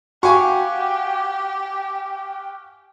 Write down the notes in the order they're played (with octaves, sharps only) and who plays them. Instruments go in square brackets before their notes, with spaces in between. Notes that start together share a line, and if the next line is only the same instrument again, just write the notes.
[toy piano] F#4 [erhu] G4 [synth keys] F5 F#5 [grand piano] G#5 C#6